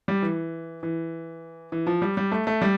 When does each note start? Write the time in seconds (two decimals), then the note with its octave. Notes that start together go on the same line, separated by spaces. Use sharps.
0.08 G3
0.22 E3
0.83 E3
1.72 E3
1.87 F3
2.02 G3
2.17 G3
2.32 A3
2.47 A3
2.62 G3